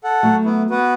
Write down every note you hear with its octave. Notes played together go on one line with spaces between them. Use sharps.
A4 F#5
F#3 A3
B3 E4
B3 F#4 B4